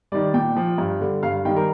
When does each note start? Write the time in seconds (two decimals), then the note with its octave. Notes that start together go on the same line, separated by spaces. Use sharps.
0.12 D#3 G3 D5
0.34 A#2 G5
0.56 F3
0.78 G2
1.01 D3 G3
1.23 G2 F5
1.45 D#3 G5
1.49 G3
1.56 A#4